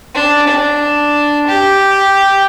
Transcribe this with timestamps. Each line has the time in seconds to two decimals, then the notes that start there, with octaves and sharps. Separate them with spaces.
0.15 D4
0.47 D4
1.47 G4